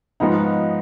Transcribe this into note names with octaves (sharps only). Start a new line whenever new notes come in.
G#2 F3 B3 D#4